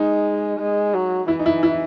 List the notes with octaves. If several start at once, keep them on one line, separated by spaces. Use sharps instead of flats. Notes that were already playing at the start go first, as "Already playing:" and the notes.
Already playing: G#3 D#4
G#3
F#3
E3 E4
D#4
E4
E4